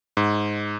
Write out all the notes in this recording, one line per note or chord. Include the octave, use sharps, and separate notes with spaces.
G#2